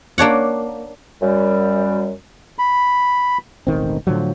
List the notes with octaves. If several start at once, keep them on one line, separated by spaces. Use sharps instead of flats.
A#3 D4 C#5 F#5
F#2 G3
B5
E1 A1 D#3 C4
A2 D3 F3 F#3